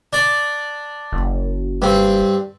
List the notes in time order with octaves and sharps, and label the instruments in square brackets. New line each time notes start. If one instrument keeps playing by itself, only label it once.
[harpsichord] D4 D5
[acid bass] F#1
[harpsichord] G2 C4